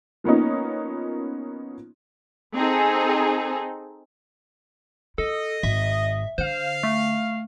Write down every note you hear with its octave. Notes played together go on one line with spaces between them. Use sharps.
F3 A#3 B3 C#4 D#4
C4 D#4 G#4 A4
E4 A4 D#5
G#1 E5
D3 C5 F5
A3